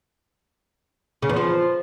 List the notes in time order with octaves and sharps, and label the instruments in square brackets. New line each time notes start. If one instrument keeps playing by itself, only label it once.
[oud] C#3
E2
F3